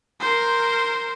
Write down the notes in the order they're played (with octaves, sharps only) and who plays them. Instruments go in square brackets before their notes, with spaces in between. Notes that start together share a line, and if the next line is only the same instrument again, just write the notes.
[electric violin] A#4 C5